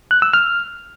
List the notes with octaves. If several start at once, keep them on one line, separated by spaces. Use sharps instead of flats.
F#6
E6
F6